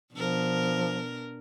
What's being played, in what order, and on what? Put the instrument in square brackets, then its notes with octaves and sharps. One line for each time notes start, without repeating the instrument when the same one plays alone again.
[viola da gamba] B2 D4 A#4 [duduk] F3